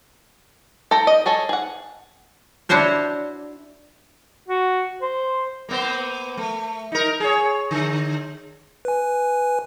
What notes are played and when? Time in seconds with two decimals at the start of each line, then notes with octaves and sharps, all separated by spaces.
0.91 A4 G5 A#5
1.07 D#5
1.26 G#4 A4 C#5 D#5
1.49 G#4 F#5
2.69 D4 E4 F#4 C5 C#5
4.48 F#4
5.02 C5
5.69 A#3 B3 C5
6.37 A3
6.92 D#4 A#4
7.20 G#4 C#5
7.71 D3
8.85 B4 G#5